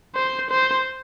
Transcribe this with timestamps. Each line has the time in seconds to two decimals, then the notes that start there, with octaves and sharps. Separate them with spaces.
0.15 C5
0.51 C5